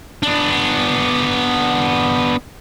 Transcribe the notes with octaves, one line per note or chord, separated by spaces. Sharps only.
B3 D4